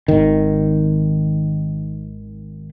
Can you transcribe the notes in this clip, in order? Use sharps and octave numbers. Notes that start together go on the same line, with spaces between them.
G#1 D#3